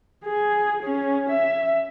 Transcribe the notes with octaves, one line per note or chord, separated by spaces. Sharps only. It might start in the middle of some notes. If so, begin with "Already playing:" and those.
G#4
C#4
E5